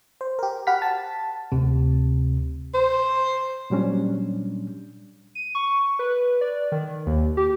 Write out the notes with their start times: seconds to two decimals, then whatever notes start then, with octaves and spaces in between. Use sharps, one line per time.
0.21 C5
0.39 G4 A#4
0.67 F#4 G4 F#5 B5 F6 B6
0.82 A5
1.52 D2 C3
2.74 C5
3.70 A#2 F#3 G3 C#4 D4
5.35 D#7
5.55 C#6
5.99 B4
6.41 D5
6.72 D#3
7.06 D#2
7.37 G4